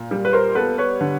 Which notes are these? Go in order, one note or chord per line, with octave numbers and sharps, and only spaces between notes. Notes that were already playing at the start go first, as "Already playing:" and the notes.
Already playing: A#2
G3
B4
A#4 C5
B3 A4 B4
B4 C#5
D3